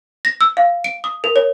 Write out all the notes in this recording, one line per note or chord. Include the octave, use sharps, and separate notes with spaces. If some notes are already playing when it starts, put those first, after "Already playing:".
A#6
E6
F5
D7
D#6
A#4
C#5